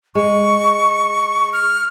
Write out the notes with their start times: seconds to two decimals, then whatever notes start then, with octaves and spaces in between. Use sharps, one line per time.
0.15 G#3 C#6
1.53 F6